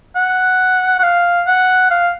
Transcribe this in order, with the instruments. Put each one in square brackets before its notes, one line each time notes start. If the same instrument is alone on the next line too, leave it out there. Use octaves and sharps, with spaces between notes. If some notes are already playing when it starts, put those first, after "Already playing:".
[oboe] F#5
F#5
F5
F#5
F5